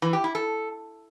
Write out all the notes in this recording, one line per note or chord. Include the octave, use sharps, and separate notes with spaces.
E3
G4
E4
A4